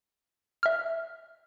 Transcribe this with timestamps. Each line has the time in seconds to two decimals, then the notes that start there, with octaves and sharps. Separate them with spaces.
0.63 E5 F6